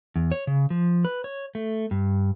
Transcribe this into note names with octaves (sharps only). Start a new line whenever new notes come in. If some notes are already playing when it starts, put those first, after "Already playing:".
E2
C#5
C#3
F3
B4
C#5
A3
G2